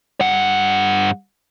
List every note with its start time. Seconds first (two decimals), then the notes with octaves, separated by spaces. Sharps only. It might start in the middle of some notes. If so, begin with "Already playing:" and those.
0.21 G2 F#5